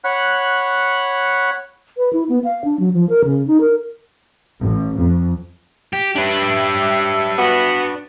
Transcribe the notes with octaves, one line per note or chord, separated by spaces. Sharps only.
C#5 F#5 B5 F#6
B4
E4
B3
F5
D4
F#3
F3
A#4
C#3
D#4
A#4
A1
F2
G4
D4 G4 B4 C#5 E5
B3 F#4